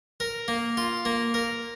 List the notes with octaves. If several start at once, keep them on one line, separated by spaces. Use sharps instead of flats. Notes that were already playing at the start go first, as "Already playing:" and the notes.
A#4
A#3
F4
A#3
A#4